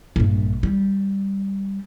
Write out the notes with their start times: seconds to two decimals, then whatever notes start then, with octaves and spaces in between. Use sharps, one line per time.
0.16 A#1 G2
0.63 G3